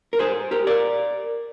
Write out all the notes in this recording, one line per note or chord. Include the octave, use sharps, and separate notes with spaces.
A#4
G#4 C5
G4 A#4
A#4 D5